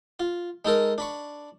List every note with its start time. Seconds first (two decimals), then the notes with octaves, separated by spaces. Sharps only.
0.20 F4
0.65 G#3 D#4 A4 A#4
0.98 D4 B5 C#6